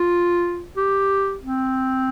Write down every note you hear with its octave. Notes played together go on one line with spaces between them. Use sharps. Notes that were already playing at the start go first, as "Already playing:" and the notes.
Already playing: F4
G4
C4